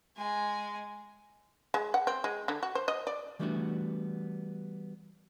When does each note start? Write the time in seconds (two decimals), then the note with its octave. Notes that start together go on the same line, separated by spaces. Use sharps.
0.16 G#3 G#5
1.74 G#3
1.94 F#5
2.07 C4
2.24 G#3
2.48 D3
2.63 F#4
2.75 C5
2.88 D#5
3.07 D5
3.39 E3 G3 A3 B3 D4 F#4